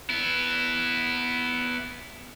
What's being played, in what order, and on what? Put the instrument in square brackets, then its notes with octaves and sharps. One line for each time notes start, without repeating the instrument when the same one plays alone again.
[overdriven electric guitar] B3 E4